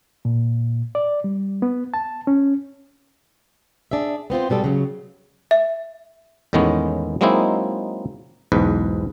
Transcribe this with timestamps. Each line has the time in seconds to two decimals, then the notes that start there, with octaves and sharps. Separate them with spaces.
0.25 A#2
0.95 D5
1.24 G3
1.62 B3
1.94 A5
2.27 C#4
3.91 D4 G#4 E5
4.30 B3 C4 F4 C5
4.49 G#2 B2 G3 A4
4.64 C#3 F#3
5.51 E5
6.53 E2 A2 D#3 G#3 B3 C#4
7.21 F#3 G#3 A#3 C4 D#4 E4
8.52 B1 E2 G#2 B4